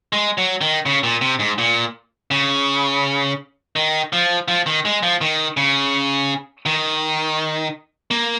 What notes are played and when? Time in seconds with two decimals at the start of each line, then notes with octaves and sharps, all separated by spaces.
0.13 G#3
0.38 F#3
0.61 D#3
0.86 C#3
1.03 A#2
1.21 C3
1.39 G#2
1.58 A#2
2.31 C#3
3.76 D#3
4.13 F3
4.48 F3
4.66 D#3
4.85 G#3
5.03 F3
5.21 D#3
5.57 C#3
6.66 D#3
8.11 A#3